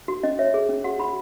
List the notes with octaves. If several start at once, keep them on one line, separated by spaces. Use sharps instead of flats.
F#4
C#4 D#5
C#5 E5
G#4
C#4
F#4 F#5
F#4 B5